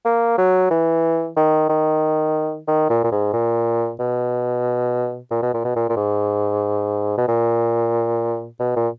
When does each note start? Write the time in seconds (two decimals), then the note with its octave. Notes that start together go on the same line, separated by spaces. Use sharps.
0.05 A#3
0.38 F#3
0.70 E3
1.36 D#3
1.69 D#3
2.68 D#3
2.90 A#2
3.04 A#2
3.12 G#2
3.33 A#2
3.99 B2
5.31 A#2
5.42 B2
5.54 A#2
5.64 B2
5.76 A#2
5.89 A#2
5.96 G#2
7.18 B2
7.28 A#2
8.59 B2
8.76 A#2